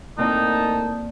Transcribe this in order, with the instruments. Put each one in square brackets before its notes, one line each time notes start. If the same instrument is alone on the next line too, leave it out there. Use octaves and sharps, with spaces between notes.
[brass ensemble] A2 A#4 A5 [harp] A#3 C4 D5 [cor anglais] D#4